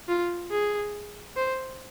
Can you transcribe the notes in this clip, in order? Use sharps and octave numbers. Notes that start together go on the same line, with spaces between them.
F4
G#4
C5